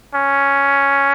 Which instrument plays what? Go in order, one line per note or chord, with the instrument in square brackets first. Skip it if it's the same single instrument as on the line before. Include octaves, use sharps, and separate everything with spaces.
[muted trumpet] C#4